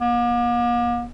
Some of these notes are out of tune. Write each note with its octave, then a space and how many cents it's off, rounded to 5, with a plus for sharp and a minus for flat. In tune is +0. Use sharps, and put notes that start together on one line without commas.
A#3 +45